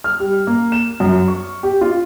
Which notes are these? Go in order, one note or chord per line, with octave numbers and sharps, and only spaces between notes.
F6
G3
A#3
E7
F#2
C#6
G4
F4